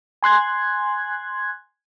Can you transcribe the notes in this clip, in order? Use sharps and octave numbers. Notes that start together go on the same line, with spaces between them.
G#5 C6 F#6 G#6